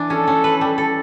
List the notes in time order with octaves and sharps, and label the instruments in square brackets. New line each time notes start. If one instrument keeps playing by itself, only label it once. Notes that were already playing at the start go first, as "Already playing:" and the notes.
Already playing: [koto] E3 D4
[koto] C#4 [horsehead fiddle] A4
[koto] C#4
B4
G3
A4